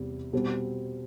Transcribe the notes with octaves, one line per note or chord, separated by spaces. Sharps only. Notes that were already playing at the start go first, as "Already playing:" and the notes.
Already playing: E2 C3 G3
B2 G3 C4